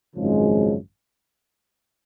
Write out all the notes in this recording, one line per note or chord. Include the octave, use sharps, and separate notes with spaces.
G#1 F#2 C#3 F3 G#3